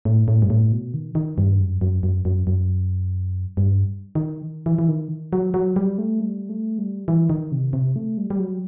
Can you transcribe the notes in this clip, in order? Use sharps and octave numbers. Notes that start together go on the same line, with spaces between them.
A2
A2
G2
A2
B2
D#3
D#3
G2
F#2
F#2
F#2
F#2
F#2
G2
D#3
E3
E3
D#3
F#3
F#3
G3
A3
G3
A3
G3
E3
D#3
C3
C3
A3
G3
G3
F#3